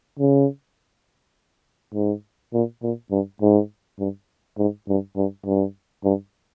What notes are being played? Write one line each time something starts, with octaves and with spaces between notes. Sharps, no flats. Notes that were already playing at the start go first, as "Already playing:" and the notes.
C#3
G#2
A#2
A#2
G2
G#2
G2
G#2
G2
G2
G2
G2